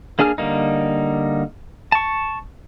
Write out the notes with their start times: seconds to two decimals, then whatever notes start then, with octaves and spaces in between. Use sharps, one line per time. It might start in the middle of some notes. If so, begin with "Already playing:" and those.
0.19 A#3 D4 G#4 G#5 F6
0.38 D3 G3 A#3 D#4
1.92 A5 C#6